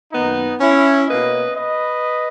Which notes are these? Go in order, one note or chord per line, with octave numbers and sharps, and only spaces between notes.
F#2 D#3 A#3 B3 D#4
C#4 E4
B2 A#3 B4 D#5
B4 D#5